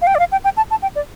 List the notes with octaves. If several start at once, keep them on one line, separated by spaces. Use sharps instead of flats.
F5
G5
D5
F5
G5
G5
A5
A5
G5
D5